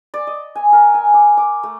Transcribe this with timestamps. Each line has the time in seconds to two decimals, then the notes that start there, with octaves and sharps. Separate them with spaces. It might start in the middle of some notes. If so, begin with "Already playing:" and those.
0.14 D5
0.27 D#5
0.55 G#5
0.73 A#4
0.94 G#5
1.14 D6
1.37 D6
1.63 A3